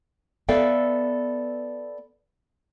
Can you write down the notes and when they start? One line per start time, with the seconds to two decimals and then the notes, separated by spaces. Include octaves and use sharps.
0.49 B3 A4 D5 E5 F5 G5